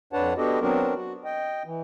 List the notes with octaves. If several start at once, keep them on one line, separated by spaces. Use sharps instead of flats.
F2 D4 B4 C#5 F#5 A5
B3 D4 F#4 G4 A4 D#5
F#3 B3 C4 D4 F#4 A#4
F#4
D#5 G5
E3